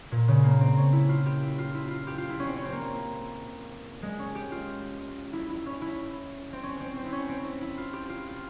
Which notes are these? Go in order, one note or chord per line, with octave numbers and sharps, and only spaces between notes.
A#2
C#3
A#3
C4
C#4
E4
F4
G4
E4
F4
E4
F4
G4
F4
E4
C#4
C4
C#4
C4
A#3
G#3
C#4
G4
F4
E4
E4
C#4
E4
C4
C#4
C4
C4
E4
C#4
C4
E4
E4
F4
G4
F4
F4